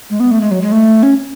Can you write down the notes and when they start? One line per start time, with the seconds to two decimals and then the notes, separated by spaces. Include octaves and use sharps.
0.10 G#3
0.20 B3
0.31 A3
0.41 G#3
0.51 F#3
0.61 G#3
0.72 A3
1.03 C#4